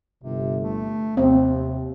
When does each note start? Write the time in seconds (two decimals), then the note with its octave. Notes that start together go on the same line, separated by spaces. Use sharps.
0.24 G1 C3
0.63 A3
1.17 D#2 C3 C4